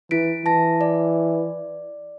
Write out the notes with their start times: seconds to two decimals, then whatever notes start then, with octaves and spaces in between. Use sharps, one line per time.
0.11 E3 E4 B6 D7
0.46 E3 A5 A#6
0.81 D5